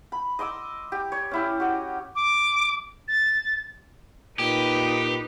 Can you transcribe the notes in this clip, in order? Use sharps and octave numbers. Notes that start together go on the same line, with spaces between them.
B5
D#5 C6 D6 E6
G4
C#5
C#4 E4 G4
F#4 G4 D#5
D6
A6
A#2 D#4 G4 B4